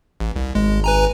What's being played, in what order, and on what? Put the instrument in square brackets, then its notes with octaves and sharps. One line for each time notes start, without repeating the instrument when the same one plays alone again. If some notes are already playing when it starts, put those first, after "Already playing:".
[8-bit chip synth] A1
C2
[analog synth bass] G#1 [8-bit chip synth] G#3
[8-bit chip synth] B4 G#5 A#5